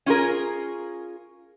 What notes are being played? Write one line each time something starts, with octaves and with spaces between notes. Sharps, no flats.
C#4 F4 G#4 A#4